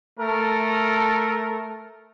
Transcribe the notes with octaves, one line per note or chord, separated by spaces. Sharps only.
A3 A4 A#4